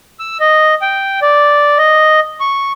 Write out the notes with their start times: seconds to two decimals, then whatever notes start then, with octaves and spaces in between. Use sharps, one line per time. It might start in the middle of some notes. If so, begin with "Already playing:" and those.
0.20 E6
0.40 D#5
0.82 G5
1.22 D5
1.78 D#5
2.40 C#6